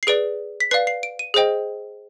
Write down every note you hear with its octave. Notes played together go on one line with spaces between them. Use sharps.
C7
G#4 B4 D5 D7
B6
B4 D5 F5 C7
C7
D7
D#7
G#4 C5 D#5 G5